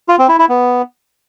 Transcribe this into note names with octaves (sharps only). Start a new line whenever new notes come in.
F4
C4
E4
E4
B3